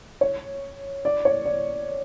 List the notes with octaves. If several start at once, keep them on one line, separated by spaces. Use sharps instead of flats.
C#5
D5
C#5
D5